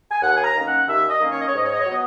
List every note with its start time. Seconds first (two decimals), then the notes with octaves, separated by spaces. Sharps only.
0.11 G#5
0.22 D#2 F#5
0.36 G#5
0.43 A#5
0.55 D#3 A#3 C#4
0.66 F#5
0.87 D#2 E5
1.09 D#5
1.20 D#3 A#3 C#4
1.31 C#5
1.40 D#5
1.48 C#5
1.54 G#2 D#5
1.64 C#5
1.73 D#5
1.80 C#5
1.86 F#3 B3 D#5